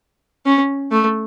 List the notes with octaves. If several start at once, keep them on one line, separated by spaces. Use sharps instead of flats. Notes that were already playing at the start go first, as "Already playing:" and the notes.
C#4
A3